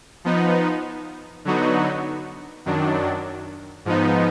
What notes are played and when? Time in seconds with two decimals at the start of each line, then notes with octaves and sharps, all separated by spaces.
0.25 F3 B3 D#4
1.45 D3 F#3 B3 D#4 F#4
2.66 F#2 D#3 F#3 D4
3.85 G#2 F3 B3 D#4